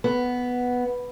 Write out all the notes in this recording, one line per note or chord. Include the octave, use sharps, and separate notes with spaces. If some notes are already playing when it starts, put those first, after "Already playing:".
B3